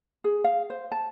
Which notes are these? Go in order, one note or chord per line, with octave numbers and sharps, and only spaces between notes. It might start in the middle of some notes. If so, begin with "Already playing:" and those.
G#4
F5
C5
A5